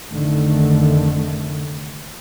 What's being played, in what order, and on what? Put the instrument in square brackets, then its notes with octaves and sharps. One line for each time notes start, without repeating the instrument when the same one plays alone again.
[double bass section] F1 D3 D#3 A3